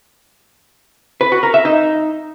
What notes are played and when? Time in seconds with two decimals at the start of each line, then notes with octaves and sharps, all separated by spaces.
1.21 B4
1.32 F#4
1.43 A#4
1.54 E5
1.65 D#4